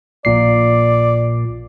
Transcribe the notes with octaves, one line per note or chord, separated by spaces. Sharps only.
A#1 A#2 D5 C7